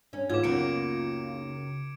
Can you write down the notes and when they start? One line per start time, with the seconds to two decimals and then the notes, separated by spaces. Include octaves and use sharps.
0.13 G2 C#4
0.30 G#2 D#3 G#3 B3 F4 D6 G#6
0.43 C#2 F#2 D#3 A#3 B3 C#7 D7
1.33 C#3